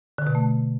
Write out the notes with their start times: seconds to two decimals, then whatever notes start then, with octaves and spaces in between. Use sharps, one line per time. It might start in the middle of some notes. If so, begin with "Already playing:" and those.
0.18 D3
0.27 B2
0.35 A3